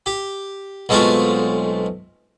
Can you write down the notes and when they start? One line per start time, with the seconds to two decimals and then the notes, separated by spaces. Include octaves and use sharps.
0.06 G4
0.89 B1 G#3 A3 C4 F4 C#6